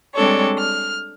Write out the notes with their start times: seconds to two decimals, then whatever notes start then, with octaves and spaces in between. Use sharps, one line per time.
0.15 G3 G#3 C4 D4 A4 C#5
0.58 F6